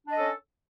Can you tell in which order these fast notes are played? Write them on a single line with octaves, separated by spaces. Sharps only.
D4 D#5 A4 C#4